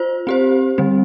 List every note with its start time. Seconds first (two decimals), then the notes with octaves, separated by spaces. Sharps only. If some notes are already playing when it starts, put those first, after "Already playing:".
Already playing: F4 C5
0.27 C4 G4 C5
0.78 D3 G3 C4